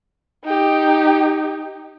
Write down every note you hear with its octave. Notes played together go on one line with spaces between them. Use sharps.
D#4 G4